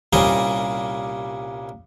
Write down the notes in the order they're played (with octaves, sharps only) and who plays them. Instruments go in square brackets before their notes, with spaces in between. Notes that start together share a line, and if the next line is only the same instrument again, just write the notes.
[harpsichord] C2 A#2 G3 C#4 C5 D#5